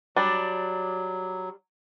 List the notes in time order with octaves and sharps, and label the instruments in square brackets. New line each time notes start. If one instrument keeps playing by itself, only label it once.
[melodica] F#3 [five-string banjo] G3 D4